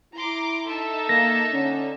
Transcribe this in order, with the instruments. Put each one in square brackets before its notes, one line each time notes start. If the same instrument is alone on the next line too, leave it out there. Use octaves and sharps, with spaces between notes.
[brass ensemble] E4 [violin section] A#5 C6 D6
[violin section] D#4 E5 A5 [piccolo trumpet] A4
[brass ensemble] A#3 [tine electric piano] A#6
[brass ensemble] D3 C#4